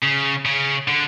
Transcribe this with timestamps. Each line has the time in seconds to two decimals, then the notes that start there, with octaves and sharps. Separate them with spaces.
0.03 C#3
0.45 C#3
0.88 D3